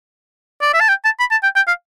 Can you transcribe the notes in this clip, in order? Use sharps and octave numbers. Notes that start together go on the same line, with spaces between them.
D5
E5
A5
G5
A5
B5
A5
G5
G5
F5